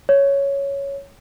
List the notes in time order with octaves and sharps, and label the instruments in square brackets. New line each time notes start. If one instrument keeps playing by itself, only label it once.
[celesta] C#5